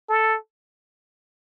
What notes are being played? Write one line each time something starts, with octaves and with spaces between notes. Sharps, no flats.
A4